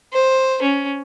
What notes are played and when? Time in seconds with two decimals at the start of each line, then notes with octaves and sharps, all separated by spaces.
0.13 C5
0.62 C#4